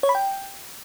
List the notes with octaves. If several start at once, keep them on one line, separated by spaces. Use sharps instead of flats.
C#5
B5
G5